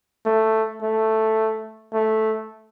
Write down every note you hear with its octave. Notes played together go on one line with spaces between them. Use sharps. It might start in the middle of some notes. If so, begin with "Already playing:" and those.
A3
A3
A3